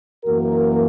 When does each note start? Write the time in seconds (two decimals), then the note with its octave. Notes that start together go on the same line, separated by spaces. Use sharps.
0.24 F#2 E3 A#3 F#4 A#4